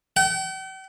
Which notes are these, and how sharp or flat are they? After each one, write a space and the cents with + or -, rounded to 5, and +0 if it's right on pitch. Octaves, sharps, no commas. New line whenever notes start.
G5 -45